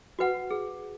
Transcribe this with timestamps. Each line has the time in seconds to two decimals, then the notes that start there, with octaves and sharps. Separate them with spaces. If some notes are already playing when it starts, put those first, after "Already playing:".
0.19 F#4 B4 F#5
0.51 G#4